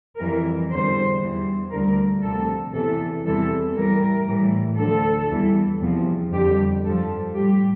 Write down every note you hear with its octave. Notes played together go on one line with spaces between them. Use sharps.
F2 E3 G3 A#4
E2 D3 G3 C5
E2 E3 G3
D2 D3 G3 A#4
D2 C3 F3 A4
E2 C3 E3 A4
E2 C3 E3 G3 A4
A2 E3 G3 A#4
A2 E3 G3
D2 D3 F3 A4
E2 E3 G3
E2 C3 F3
F2 D3 G3 G4
G2 F3 A4
A2 G3 G4